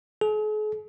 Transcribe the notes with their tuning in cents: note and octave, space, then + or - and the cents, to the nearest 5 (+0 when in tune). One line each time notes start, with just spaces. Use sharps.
G#4 +45